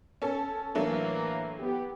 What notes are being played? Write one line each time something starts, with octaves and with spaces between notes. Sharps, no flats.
C#4 A4
A2 E3 F#3 A3 A#3 D4
B3 G4